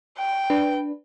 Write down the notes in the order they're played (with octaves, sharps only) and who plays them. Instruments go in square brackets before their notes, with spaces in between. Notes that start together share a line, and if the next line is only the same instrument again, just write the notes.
[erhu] G5
[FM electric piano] D4 B4